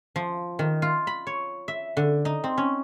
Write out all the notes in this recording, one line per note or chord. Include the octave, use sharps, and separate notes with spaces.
F3
D#3
F4
B5
C#5
E5
D3
D#4
C4
C#4